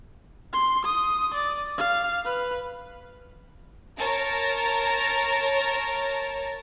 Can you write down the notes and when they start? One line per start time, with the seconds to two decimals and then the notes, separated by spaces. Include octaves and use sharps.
0.53 C6
0.85 D#6
1.34 D5
1.78 F5
2.25 B4
3.98 A#4 C#5 A5 A#5